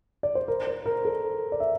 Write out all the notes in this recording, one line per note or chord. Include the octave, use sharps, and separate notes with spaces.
D5
C5
A#4
C5
A#4
A4
D5
E5